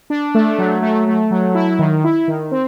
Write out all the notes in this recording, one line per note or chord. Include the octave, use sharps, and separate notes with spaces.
D4
A3
F#3
A3
A3
F#3
E4
D#3
E4
D#3
C4